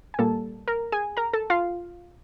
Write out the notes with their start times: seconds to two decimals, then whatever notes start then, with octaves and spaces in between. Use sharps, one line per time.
0.14 G#5
0.19 A#2 G3 A#3 A4 A5
0.68 A#4 A#5
0.92 G#4 G#5
1.17 A#4 A#5
1.33 A4 A5
1.50 F4 F5